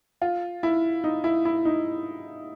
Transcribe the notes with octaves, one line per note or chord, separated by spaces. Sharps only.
F4
E4
D#4
E4
E4
D#4